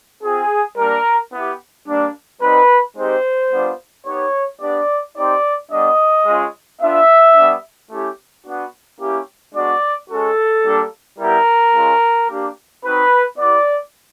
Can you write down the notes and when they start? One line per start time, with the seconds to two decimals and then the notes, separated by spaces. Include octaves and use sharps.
0.23 C4 F4 G#4
0.77 G3 A#3 D4 A#4
1.33 B3 E4 G4
1.88 G3 A#3 D4
2.42 G3 C4 D#4 B4
2.97 G#3 C4 D#4 G4 C5
3.51 G3 B3 D4 F4
4.06 B3 D#4 G4 C#5
4.61 B3 D4 G4 D5
5.16 C4 D#4 G4 D5
5.71 G3 B3 D4 D#5
6.26 G#3 C#4 F4
6.81 B3 D4 F4 E5
7.35 G3 B3 D4
7.90 A3 C#4 E4 G4
8.45 B3 D4 F#4
9.00 A#3 C#4 E4 G4
9.54 G#3 B3 D4 F#4 D5
10.10 G#3 C#4 F#4 A4
10.65 G3 A#3 D4
11.19 G3 B3 E4 G4 A#4
11.74 G#3 C#4 F4
12.30 A#3 D4 G4
12.84 C4 D#4 F#4 B4
13.39 B3 E4 G4 D5